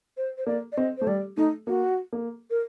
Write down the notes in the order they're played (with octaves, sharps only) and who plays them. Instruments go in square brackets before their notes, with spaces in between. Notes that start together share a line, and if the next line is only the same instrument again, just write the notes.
[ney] C5
C5
[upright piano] A#3 [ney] D5
[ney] D5
[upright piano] C4 [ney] D#5
[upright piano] A3 [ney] C5
[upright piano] G3 [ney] D5
[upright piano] A3 [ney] D#4
[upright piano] A#3 [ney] F#4
[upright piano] A#3
[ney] A#4